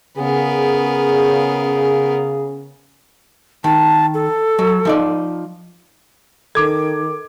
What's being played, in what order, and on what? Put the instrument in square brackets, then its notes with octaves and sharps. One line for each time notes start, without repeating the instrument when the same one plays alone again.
[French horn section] C#3 [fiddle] B3 A#4 [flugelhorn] G#4
[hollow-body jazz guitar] D#3 [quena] A5
[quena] A4
[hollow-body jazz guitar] F#3
F3 D#4 D5
[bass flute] D#3 [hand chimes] A4 [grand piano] D6 G#6